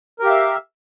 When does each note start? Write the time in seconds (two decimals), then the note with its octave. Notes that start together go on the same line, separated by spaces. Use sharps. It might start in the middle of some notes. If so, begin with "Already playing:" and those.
0.19 A#4
0.23 G4
0.26 F5
0.30 E5